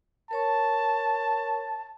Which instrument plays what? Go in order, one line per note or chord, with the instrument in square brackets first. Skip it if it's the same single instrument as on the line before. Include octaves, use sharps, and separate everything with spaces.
[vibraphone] A#4 C#5 C#6 [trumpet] A5